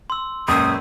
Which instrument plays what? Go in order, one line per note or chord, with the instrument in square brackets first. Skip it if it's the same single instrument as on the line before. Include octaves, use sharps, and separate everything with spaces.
[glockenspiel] C6 E6
[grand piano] C#2 F#2 A#2 [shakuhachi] D#6